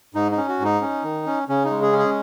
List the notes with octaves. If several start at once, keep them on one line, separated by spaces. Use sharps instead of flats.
G#2 D#4
D#4
C#4
F#4
G#2
D#4
C#4
D#3
C#4
C#3 C#4
D#4
G#3
G#4
C#4
G#4